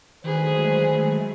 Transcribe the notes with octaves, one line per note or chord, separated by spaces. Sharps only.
D3 D#3 F#3 G#3 A3 G#4 B4 C5